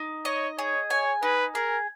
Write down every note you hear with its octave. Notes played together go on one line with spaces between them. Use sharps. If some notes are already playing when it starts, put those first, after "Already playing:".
Already playing: D#4
C#5 D#5
G#4 C#5
C#5 G#5
D#4 B4
G#4 A#4